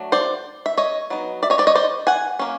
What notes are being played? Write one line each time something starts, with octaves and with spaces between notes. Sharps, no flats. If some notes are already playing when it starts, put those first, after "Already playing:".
Already playing: F#3 A3 D4
C5 D5
E5
C#5 D#5
F#3 B3 D#4
D5 E5
C#5 D#5
C5 D5
C#5 D#5
C5 D5
F#5 G#5
F#3 A#3 C#4